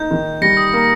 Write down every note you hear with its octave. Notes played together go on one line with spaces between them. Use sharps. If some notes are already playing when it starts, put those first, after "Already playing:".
Already playing: A#3 D#4 G6
D#3
G3 A#6 C#7
D#6
A#3